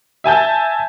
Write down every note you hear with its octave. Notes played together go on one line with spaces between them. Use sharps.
E5 G#5 A5 G6